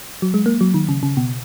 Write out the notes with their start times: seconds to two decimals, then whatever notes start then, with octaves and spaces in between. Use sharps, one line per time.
0.22 F#3
0.34 G#3
0.46 A#3
0.61 F#3
0.74 D#3
0.89 C#3
1.03 C#3
1.17 B2